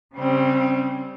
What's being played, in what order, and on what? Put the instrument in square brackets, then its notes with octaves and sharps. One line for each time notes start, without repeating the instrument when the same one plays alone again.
[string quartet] C#3 G3 C4